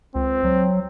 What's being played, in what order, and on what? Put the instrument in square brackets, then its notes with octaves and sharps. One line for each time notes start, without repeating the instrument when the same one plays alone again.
[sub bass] C#2 [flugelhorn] C4
[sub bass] F#3